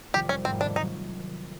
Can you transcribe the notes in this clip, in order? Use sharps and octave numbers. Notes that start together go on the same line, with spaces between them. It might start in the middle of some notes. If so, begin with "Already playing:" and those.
F2 C3 D#3 G3 G4
C#4
G#1 G#2 F3 A3 C4
D4
D#3 F#3 D#4